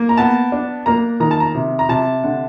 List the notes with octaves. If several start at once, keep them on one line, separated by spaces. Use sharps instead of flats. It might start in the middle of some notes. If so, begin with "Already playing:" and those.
Already playing: A#3
A#5
B3 A5
D4
A#3 A#5
D#3 A#5
A5
A#5
C3
A#5
C3 A5
D3